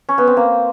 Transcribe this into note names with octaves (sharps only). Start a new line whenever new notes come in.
C#4
B3
C4
A#3